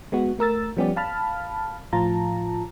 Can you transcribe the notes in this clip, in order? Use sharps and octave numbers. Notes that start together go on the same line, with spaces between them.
G#3 B3 F#4
A3 A#4 E6 A6
F3 G3 B3 C#4 G4 D5
F5 A5 B5 F6
A2 F3 F4 A5 A#5